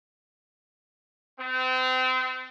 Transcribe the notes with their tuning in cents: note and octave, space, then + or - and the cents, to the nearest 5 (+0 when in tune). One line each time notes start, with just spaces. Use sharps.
C4 -30